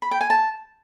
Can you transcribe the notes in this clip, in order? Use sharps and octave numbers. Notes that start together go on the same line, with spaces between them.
B5
G5
G#5
A5